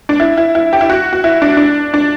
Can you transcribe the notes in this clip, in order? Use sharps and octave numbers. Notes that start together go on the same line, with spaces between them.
D4
E4
E4
E4
G4
E4
F#4
F#4
E4
D4
D4
D4